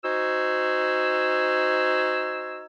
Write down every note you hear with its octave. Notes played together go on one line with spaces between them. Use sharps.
D#4 F#4 C5 G#5 E6